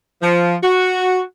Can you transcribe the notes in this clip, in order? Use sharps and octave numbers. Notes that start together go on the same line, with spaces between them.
F3
F#4